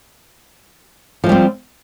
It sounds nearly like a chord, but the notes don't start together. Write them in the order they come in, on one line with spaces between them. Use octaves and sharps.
F3 G#3 G3 C4